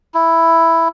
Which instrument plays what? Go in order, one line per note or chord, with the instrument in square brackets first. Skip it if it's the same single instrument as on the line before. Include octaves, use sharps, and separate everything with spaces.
[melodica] E4